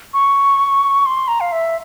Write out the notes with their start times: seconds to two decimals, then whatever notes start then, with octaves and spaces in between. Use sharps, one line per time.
0.13 C#6
1.06 C6
1.28 A#5
1.41 F5
1.52 E5